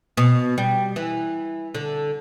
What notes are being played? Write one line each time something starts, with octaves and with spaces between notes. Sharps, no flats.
B2
G3
E3
D3